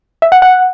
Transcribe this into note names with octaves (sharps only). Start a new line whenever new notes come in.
E5
F#5
F#5